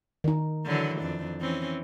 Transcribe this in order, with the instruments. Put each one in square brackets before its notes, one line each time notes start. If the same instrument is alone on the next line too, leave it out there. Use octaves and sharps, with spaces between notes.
[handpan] D#3 D#4
[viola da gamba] D3 E3 F#3
F2 D4
E3 C4 C#4